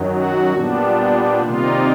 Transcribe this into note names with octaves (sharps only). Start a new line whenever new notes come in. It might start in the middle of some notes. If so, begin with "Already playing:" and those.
Already playing: F#2 D#3 F#3
F#4
A#2 G3 B3 D4
C3 D#3 G3 A#3 D#4 F4